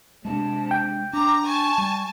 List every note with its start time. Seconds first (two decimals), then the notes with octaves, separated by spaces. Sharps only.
0.25 C3 G#3 C4 D4 A5
0.71 G5
1.13 D4 A#5 D6
1.45 G#5 A5 C#6
1.78 G3 C#6